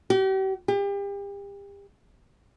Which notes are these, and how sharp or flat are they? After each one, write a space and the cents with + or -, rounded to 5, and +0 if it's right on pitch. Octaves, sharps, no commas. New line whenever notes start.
G4 -40
G4 +35